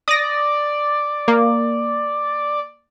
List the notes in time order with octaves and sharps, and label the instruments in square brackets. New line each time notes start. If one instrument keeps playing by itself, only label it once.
[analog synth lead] D5 [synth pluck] D#6 A#6
[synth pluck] A#3